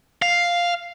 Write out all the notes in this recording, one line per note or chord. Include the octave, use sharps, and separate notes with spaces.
F5